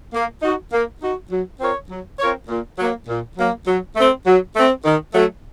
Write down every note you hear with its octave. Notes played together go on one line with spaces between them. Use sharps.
A#3
D#4 F#4
A#3
D#4 F#4
F#3
C4 F4 A#4 C#5
F#3
C4 F4 A#4 C#5
A#2
F#3 A#3
A#2
F#3 A#3
F#3
A3 C4
F#3
A3 C4
D#3
F#3 A3